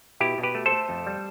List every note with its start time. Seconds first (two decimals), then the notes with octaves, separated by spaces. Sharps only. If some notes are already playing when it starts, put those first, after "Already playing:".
0.20 B2 E4 G4
0.38 B2
0.43 G4 B4
0.55 A3
0.66 A4 C5
0.72 A3
0.89 F2
1.07 G3